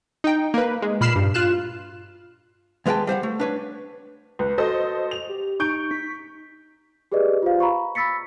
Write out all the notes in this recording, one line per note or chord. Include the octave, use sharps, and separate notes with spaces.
D#4 G5
A#3 B4
G#3
A#2 B5 F6 C7 E7
G2
F4 F6 F#6 E7
D#2 G#3 B4 F5 G5 A5
G3 C5 F5 F#5
A3
D4 B4 C#5
C#2 B4
F#4 A4 C5 D#5
F7
G4
D#4 C#6 G6 D7
B6
G4 G#4 B4 D5 D#5
F4 C5 F5
A#5 B5 C#6
B5 E6 A6 B6 C#7